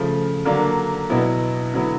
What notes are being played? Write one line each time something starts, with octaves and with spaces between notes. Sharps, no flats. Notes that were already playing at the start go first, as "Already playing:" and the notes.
Already playing: C#3 F3 A3
D3 F#3 A#3 D4
B2 F#3 B3 E4
D3 F#3 B3 E4